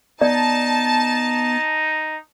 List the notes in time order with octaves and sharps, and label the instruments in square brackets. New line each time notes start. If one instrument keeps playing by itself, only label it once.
[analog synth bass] B3 [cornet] D#4 [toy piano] D5 [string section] A5